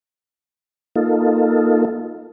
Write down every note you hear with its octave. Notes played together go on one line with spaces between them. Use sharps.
A#3 D#4 F4 A4